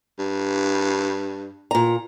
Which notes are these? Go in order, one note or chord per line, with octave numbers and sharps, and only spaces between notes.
G2
A#2 A#5